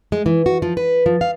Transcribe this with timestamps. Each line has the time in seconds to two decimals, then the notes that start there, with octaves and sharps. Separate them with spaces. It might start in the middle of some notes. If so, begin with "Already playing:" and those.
0.12 G#3
0.26 E3
0.46 F#4
0.62 F3
0.77 B4
1.06 F3
1.21 F5